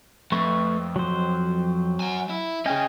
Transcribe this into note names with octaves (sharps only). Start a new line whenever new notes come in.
F2 A3 B4 C#6
F#3 C5
F#5 G#5
E4
C#4 G#4 D#5 G5 G#5